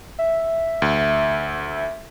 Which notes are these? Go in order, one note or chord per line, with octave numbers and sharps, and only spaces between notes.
E5
D2